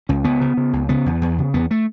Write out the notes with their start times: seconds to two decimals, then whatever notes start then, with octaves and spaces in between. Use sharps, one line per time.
0.09 C#2 C#4
0.24 C#2 B3
0.41 C#3
0.57 C#3
0.73 C#2
0.89 C#3 B3
1.06 E2
1.22 E2
1.38 C#3
1.54 E2 B3
1.71 A3